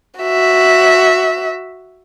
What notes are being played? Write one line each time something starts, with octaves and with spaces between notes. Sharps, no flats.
F#4 E5